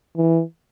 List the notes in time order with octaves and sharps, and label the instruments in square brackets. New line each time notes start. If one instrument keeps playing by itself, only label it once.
[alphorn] E3